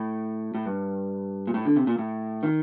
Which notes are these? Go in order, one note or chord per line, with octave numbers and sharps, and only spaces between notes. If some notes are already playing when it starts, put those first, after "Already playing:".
Already playing: A2
A2
G2
A#2
A2
D3
C3
A#2
A2
D#3